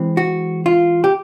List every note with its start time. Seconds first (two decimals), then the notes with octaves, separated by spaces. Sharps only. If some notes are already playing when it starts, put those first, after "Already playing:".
Already playing: E3 G#3 C4
0.17 F#4
0.66 F4
1.04 G4